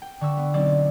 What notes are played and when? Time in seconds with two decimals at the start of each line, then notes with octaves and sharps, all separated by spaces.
0.02 G5
0.21 D3 C#6 E6
0.37 B3
0.54 B1 C4 D5 D6